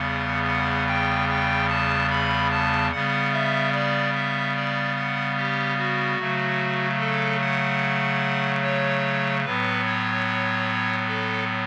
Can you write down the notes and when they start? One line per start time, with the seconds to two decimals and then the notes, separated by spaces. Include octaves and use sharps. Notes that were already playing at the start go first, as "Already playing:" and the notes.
Already playing: E2 C#3 G3 B3 F#5
0.47 F#5
0.88 G5
1.29 G5
1.70 A5
2.11 B5
2.51 A5
2.92 C#3 G3 B3 F#5
3.33 E5
3.73 D5
4.14 E5
4.55 D5
4.96 F#5
5.37 G4
5.77 F#4
6.18 C#3 F#3 A3
7.00 A4
7.41 F#5
8.63 C#5
9.44 A2 F#3 B3 B4
9.85 C#5
11.08 A4